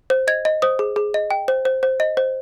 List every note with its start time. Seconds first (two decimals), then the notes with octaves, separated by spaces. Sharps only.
0.10 C5
0.28 D#5 G#6
0.45 D#5
0.62 C5 D#6
0.79 G#4
0.96 G#4
1.14 D#5
1.31 G5
1.48 C5
1.65 C5
1.83 C5
2.00 D#5
2.17 C5